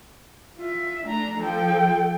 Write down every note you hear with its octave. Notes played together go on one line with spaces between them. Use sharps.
F4 E5
A3 D4 A#5
F3 A4 G5